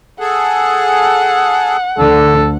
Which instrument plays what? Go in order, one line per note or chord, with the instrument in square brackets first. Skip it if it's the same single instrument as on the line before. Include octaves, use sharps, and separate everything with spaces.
[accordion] G#4 A4 [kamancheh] F#5
[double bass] D2 D3 [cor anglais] A4